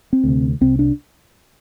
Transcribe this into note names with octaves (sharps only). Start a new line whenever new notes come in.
C4
D2 C3
C2 C3 C4
D4